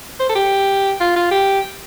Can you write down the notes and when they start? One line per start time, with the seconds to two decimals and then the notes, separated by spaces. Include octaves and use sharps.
0.20 C5
0.29 A4
0.35 G4
1.00 F4
1.16 F4
1.31 G4